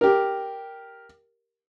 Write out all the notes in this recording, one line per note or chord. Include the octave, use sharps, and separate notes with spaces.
G4 A#4